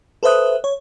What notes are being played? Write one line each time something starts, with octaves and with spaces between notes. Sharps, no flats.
A4 B4 C5 E5 D#6 F#6
C#5